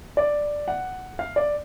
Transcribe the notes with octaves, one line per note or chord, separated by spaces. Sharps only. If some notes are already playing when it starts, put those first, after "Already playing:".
D5
F#5
F5
D5